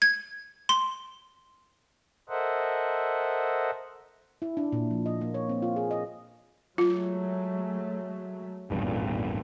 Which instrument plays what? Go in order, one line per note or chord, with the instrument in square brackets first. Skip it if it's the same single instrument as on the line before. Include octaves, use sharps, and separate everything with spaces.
[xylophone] G#6
C6
[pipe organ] A4 A#4 C5 D#5 E5 F#5
[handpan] E4
D4
A#2
F3
D#5
A#3
C#5
C4
F4
G#4
D#5
[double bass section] F#3 G#3 A3 [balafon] F4
[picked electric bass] G#1 E2 G2 [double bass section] A#2 A3